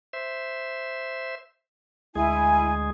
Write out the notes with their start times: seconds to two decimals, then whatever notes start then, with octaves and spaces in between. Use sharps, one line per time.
0.13 C5 E5
2.16 D2 G#3 E4 G#4 G#5